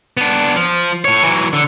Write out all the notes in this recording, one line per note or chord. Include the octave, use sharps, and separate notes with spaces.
B3 D4
F3
A2 C#5
E3 F#3
D3